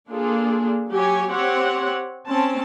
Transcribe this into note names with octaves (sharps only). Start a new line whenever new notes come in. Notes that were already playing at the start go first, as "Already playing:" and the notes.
A#3 D4 F4 G#4 A4
F#3 G4 C#5 G#5
C4 G4 C#5 F#5
C4 C#4 A5